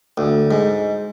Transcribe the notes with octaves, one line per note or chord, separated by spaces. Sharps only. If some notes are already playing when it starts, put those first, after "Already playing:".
D2
G#2